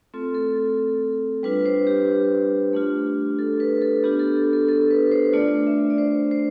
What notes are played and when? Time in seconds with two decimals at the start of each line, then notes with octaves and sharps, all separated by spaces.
0.14 A3 C4 F4 A4
0.35 A4
0.56 A4
1.43 G3 D4 F4 B4
1.66 C5
1.87 G4
2.73 A3 D4 F4
3.39 A4
3.60 B4
3.82 A4
4.04 B3 D4 F4 G4
4.19 A4
4.53 A4
4.68 A4
4.91 B4
5.11 C5
5.33 A3 D4 F4 D5
5.67 E5
5.90 D5
5.98 C5
6.31 C5